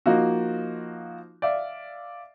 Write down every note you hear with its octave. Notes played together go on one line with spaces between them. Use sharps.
F3 A#3 D#4 F4 F#4
D5 E5 F5